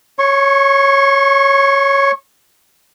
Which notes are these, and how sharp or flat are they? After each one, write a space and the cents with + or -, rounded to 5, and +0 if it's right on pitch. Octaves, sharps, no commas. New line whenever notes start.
C#5 +0 C#6 -35